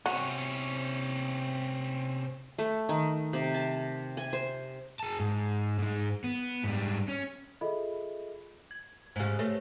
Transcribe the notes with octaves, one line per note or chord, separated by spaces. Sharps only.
C3 C4 C#4 F#4
A3
D#3
C3
A5
G#5
C5
G#4 A5
G#2
G#2 G#3
B3
G#2 G3
C#4
F4 G#4 A4 D#5 E5 B5
G#6
G#2 C#3 G4 C5
A3 B4 C#5